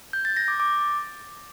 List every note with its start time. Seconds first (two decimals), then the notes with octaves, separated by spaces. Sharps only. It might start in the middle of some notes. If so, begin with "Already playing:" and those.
0.13 G6
0.25 A6
0.37 A#6
0.48 D6
0.60 D6